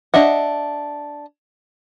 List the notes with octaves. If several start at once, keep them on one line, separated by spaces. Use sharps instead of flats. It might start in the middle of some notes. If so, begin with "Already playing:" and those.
D4 D#5 E5 F#5